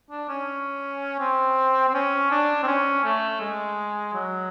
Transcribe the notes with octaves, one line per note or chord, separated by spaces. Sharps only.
D4
C#4
C4
C4
C#4
D4
C4
C#4
A3
G#3
F#3